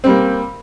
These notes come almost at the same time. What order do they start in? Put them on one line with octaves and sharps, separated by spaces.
C4 G3 A#3